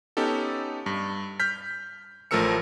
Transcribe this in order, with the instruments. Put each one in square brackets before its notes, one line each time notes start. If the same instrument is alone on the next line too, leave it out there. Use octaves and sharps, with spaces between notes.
[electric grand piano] B3 C#4 D#4 G4 A4
G2
F6 G6 B6
A1 F3 A3 A#4 E6 C#7